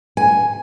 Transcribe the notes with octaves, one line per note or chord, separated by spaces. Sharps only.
G#5